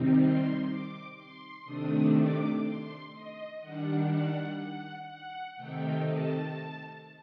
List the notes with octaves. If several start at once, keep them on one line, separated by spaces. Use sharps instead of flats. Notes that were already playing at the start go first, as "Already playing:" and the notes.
Already playing: C3 D#3 G3 C4 D#4
C6
D6
C6
C3 D#3 A3 D4 D#6
D6
C6
D#5
D#3 G3 D4 F#5
F#5
F#5
F#5
C3 D#3 A3 D#4 G5
A5